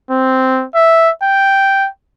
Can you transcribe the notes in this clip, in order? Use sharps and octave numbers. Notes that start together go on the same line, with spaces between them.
C4
E5
G5